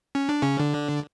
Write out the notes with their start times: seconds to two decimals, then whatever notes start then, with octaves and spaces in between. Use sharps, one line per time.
0.15 C#4
0.29 D4
0.42 C#3 C#4
0.59 D3 D4